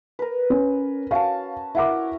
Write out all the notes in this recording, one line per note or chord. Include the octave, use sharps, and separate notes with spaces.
A#4 B4
C#4
C#4 F#4 F5 A5
E4 A#4 E5 F#5 D6